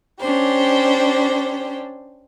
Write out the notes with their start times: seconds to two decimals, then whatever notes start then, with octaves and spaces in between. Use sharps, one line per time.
0.19 C#4 D4 G4 C5